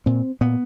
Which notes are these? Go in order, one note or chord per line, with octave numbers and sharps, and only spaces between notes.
A#2 C4
A#2 B3